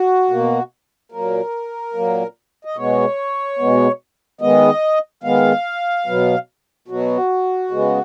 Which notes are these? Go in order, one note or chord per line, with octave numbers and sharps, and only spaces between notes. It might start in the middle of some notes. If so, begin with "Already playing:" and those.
Already playing: F#4
B2 A#3
A#2 F#3 A#3 A#4
A#2 F#3 A#3
D#5
B2 G#3 B3 C#5
B2 G#3 B3
D#3 G#3 B3 D#5
D#3 G#3 B3 F5
B2 F#3 B3
B2 F#3 B3 F#4
C#3 G#3 B3